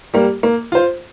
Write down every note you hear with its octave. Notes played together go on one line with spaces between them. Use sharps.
G3 A#3
A#3
F4 C5